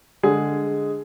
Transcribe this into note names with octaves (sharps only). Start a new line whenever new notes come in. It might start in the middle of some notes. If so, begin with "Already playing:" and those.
D3 G#3 G#4